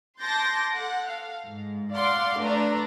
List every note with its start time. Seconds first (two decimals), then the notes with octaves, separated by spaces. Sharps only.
0.21 A5 C6 D6 G6 A6 A#6
0.74 A4 F#5
1.09 F5
1.45 G#2
1.95 D5 F5 F#5 C6 D6
2.39 A3 D4 B4 A#5